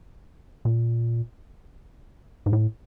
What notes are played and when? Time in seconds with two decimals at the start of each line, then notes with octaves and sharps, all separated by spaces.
0.65 A#2
2.46 G#2
2.53 A2